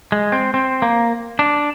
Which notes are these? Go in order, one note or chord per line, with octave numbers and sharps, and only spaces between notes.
G#3
C4
C4
A#3
D4